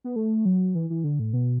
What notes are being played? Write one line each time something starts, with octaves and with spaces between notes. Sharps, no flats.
B3
A3
F#3
E3
E3
D3
A2
B2